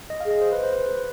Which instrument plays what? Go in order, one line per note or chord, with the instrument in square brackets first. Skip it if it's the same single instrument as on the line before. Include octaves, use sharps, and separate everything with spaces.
[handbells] D#5
F5
[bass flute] G#4 [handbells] D#5
[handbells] C5
B4
C5
B4